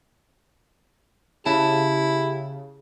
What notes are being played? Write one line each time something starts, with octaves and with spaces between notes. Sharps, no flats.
C#3 E4 G4 A5